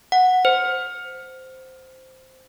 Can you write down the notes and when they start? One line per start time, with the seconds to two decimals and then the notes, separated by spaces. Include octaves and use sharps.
0.12 F#5
0.45 C5